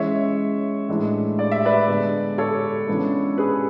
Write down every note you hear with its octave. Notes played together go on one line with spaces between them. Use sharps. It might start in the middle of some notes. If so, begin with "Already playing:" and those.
Already playing: E3 G#3 C#4 C#5 E5
A2 E3 G#3 D4
D5
E5
B4 D5
D3 G#3 B3 D4
A4 C#5
C#3 E3 G#3 B3 D4
G#4 B4